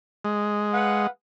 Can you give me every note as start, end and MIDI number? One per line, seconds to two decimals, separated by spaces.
0.25 1.07 56
0.73 1.07 71
0.73 1.07 77
0.73 1.07 78